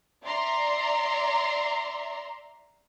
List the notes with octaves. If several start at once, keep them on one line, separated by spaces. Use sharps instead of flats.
D5 E5 A#5 C6